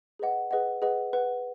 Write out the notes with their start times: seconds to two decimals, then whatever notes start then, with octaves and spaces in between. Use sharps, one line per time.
0.19 G#4 B4 D#5 F#5
0.51 G#4 B4 D#5 F#5
0.82 G#4 B4 D#5 F#5
1.13 B4 F#5